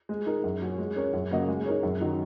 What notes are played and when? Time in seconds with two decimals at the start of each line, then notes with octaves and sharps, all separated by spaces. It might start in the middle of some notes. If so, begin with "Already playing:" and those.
0.09 G#3
0.26 D#4 A#4
0.44 F#2
0.62 F#3 C#4
0.78 G#3
0.96 C#4 A#4 C#5
1.13 F#2
1.31 C#3 A#3 F#4 D#5
1.48 G#3
1.66 D#4 A#4 C#5
1.83 F#2
2.01 D#3 F#3 D#4